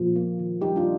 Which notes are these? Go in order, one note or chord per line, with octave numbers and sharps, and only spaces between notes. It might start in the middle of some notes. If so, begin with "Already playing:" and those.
Already playing: A#2 F3
A#3
D#3
G3 D#4 G4
D4 F4